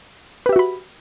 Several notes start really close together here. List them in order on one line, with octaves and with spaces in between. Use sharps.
B4 G4 E5 F#4 B5